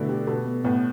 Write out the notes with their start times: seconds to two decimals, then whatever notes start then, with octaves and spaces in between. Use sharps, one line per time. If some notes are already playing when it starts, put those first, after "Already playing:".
Already playing: B2 D3 A3 E4
0.09 G4
0.27 B2 A4
0.46 B3
0.64 A2 B3